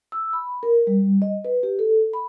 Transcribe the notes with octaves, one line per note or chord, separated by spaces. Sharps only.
E6
B5
A#4
G3
D#5
B4
G4
A4
B5